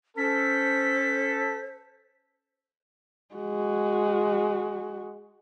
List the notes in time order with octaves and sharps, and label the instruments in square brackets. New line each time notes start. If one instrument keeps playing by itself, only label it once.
[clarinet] C#4 [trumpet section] A4 [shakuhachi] C5 [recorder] B6
[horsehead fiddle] G#3 F#4